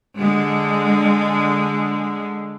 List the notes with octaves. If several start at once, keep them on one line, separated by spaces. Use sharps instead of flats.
D3 G#3